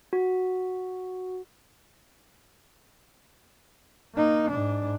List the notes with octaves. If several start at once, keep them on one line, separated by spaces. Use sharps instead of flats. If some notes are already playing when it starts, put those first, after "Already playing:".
F#4
A#3 D#4
G#2 D4